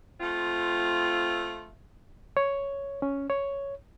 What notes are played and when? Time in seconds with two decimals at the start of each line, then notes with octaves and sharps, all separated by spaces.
0.19 A3 C4 F4
2.37 C#5
3.02 C#4
3.30 C#5